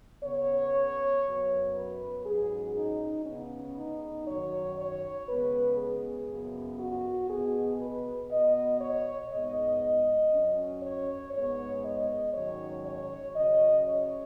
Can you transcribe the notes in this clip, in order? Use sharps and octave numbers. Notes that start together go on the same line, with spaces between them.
C#3 B3 C#5
F#2 F#3 B3
B4
G#2 F#3 C#4 G#4
D#4
C#3 B3 C#4
D#4
F#2 D#3 F#3 C#5
C#5
C#3 G#3 B3 B4
G#4
F#2 C#3 B3
F#4
B2 B3 G#4
B4
B2 B3 D#5
C#5
G#2 G#3 B3 D#5
F#2 F#3 C#4
C#5
G#2 G#3 B3 C#5
D#5
G#2 D#3 F#3 C#4 C#5
C#5
C#3 F#3 C#4 D#5
C#5